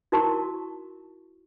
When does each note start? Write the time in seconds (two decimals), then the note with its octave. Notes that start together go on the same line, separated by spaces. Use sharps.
0.12 D#4 E4 F#4 A#4 A5 C#6